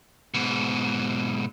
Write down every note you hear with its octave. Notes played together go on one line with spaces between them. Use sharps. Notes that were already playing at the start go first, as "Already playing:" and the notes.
G#2 B2